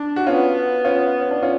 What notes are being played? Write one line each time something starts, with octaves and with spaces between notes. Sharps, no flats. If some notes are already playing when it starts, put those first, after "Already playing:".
Already playing: D4
F#4
B3 C#4 F4
C#4 F4
C#4
D4
C#4 F4